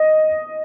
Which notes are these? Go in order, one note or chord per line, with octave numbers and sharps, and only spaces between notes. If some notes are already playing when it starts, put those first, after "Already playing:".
Already playing: D#5